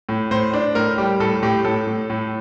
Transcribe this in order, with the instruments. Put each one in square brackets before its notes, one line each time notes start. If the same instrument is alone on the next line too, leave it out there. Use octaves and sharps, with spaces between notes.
[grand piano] A2
A2 C5
D4
A2 A#4
G3 G4
A2 A4
A2 G4
A2 A4
A2
A2